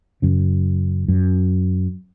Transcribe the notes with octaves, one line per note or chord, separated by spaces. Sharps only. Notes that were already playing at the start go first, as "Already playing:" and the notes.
F#2 C#3
F#2